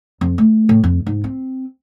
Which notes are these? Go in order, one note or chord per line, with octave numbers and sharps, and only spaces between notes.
F2
A3
A2
F2
G#2
C4